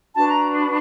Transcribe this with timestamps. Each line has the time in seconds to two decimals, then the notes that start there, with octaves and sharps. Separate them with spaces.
0.14 D4 F#4 B4 A5
0.29 A#5